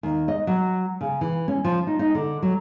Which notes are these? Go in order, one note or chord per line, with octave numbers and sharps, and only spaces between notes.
D#2
D#5
F#3
C#3
E3
C#4
F3
D#4
D#4
D3
F#3